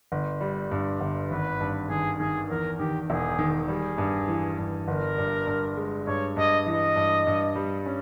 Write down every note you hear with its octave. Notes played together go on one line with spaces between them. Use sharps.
G1
G3
G2
G1
G#1 B4
G2
D#3 G#4
D#3 G#4
E2 A#4
D#3 G4
E1 G#4
D#3
G3 G#4
G2
E3
G2
G1 A#4
G2
G2
G#3
G2 C#5
G2 D#5
E3 D#5
G2
G2
G3
C#4